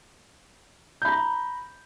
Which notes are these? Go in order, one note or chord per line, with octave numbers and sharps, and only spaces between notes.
A#5 B5 G6